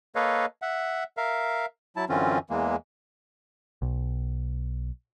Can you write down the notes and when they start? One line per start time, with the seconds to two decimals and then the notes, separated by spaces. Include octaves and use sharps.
0.15 A#3 A4 B4 C#5 D#5 F5
0.62 E5 F#5
1.17 A#4 E5 F5
1.96 F#3 E4 A5
2.09 F#2 D3 E3 C4 C#4 F4
2.50 E2 E3 G#3 A#3
3.82 B1